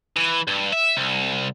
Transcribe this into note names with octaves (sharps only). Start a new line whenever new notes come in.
E3
G2
E5
C2